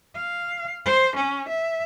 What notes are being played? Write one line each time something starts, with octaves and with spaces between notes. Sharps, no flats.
F5
C5
C#4
E5